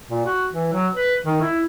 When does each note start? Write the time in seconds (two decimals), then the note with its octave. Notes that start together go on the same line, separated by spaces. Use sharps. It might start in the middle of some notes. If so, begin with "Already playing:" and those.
0.10 A#2
0.25 F#4
0.52 E3
0.73 F#3
0.94 B4
1.26 D#3
1.41 E4